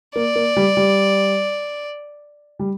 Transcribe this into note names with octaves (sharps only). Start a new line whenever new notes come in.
A#3 D5
A#3
G3
G3
G3